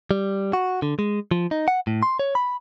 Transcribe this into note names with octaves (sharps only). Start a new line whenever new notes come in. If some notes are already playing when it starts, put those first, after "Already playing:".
G3
F#4
D3
G#3
F3
D#4
F#5
A2
C6
C#5
B5